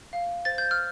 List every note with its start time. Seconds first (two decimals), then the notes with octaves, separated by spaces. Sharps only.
0.13 F5
0.45 C5 A6
0.58 G6
0.71 F6